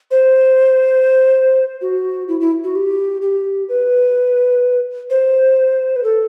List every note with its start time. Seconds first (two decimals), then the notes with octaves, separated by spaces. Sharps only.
0.11 C5
1.81 F#4
2.28 E4
2.41 E4
2.64 F#4
2.76 G4
3.22 G4
3.69 B4
5.10 C5
5.96 B4
6.04 A4